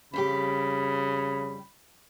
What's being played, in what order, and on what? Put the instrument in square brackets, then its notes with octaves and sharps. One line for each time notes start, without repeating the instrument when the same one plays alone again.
[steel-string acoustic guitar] F2 G3 G4 [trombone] C#3 [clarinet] B5